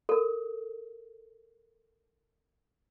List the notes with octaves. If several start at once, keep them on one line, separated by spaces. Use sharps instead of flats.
A4 A#4